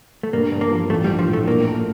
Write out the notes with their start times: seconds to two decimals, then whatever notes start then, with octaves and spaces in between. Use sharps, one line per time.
0.23 A3
0.33 G2 A#3
0.52 G2
0.61 A#3
0.71 F3
0.90 A1 A3
1.04 G3
1.10 D4
1.19 F3
1.28 A2
1.33 A3
1.47 A#1 A#3
1.66 A3